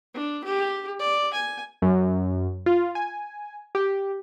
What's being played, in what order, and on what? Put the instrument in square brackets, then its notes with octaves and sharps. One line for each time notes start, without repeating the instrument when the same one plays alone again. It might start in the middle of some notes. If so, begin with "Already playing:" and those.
[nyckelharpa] D4
G4
D5
G#5
[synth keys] F#2
F4
G#5
G4